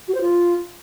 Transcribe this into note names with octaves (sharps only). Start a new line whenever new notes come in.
F#4
C5
F4